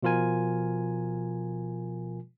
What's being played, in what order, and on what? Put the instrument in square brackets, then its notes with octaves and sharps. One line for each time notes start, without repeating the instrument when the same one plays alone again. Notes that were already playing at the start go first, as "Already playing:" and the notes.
[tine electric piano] B2 F3 F4 A#4 G#5